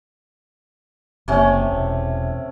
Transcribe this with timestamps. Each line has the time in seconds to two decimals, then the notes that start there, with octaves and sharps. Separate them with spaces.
1.28 F#1 C3 A3 A#3 C#4
1.71 E1